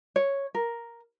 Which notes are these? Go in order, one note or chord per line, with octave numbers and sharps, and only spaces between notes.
C#5
A#4